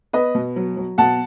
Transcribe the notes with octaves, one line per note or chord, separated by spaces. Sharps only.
B3 B4 D#5
B2
F#3
F#3
B2 F#5 A5